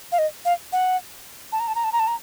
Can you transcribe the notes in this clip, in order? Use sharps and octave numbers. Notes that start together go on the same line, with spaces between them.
F5
D#5
F5
F#5
A5
A#5
A5
A#5
A5
A#5
A5
A#5